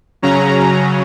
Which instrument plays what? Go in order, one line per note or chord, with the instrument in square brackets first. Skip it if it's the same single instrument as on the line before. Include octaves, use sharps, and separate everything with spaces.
[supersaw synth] C#3 F#3 C#4 A#5